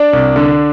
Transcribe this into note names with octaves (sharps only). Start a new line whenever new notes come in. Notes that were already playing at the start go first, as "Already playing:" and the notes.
Already playing: D4 D5
C2
D3